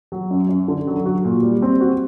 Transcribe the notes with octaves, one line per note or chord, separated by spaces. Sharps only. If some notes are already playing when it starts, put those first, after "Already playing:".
F#3
F#2
F#2
D3
F#3
F#4
A#2
G3
C4
F#4